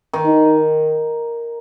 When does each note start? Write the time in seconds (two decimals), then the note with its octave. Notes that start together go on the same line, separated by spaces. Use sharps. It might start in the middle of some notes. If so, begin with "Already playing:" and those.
0.13 D#3
0.26 D#4